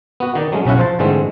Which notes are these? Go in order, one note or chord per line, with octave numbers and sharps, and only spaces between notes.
B3 F#4
D#3 D#4 D5
F#3 G#3 A3 C#4
B1 C#3 C#4 E4 F#5
F3 C5 A5
G#2 D3 E3 G#3 A3 C4